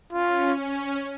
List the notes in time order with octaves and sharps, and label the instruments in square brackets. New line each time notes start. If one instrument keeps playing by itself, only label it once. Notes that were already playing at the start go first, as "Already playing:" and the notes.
[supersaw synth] C#4 [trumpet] F4
[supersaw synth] C#4